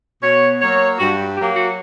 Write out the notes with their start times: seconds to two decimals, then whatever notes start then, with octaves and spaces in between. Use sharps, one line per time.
0.23 B2 C#5
0.61 F#3 A#3 C#5
0.99 G2 F#4
1.37 F#3 A#3 G4
1.55 F#4